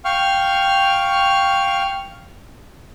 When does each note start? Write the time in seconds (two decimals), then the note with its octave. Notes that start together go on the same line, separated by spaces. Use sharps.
0.05 F5 G5 C#6 F6